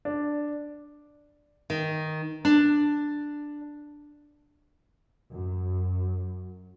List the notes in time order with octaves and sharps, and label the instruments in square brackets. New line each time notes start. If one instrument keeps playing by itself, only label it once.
[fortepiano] D4
[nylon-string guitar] D#3
D4
[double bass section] F#2